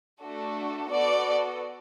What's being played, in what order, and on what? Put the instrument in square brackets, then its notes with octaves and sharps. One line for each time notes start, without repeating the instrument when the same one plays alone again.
[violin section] A3 D4 F#4 A4
B3 F#4 A4 D5